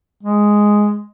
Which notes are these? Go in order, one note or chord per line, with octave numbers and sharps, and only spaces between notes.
G#3